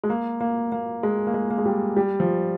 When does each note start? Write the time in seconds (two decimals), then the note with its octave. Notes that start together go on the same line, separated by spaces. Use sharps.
0.04 G#3
0.10 A#3
0.41 A#3
0.72 A#3
1.03 G#3
1.27 A#3
1.34 G#3
1.51 A#3
1.58 G#3
1.66 G3
1.97 G3
2.20 F3